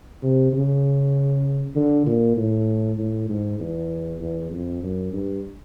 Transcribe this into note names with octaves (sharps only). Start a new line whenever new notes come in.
C3
C#3
D3
A#2
A2
A2
G#2
E2
E2
F2
F#2
G2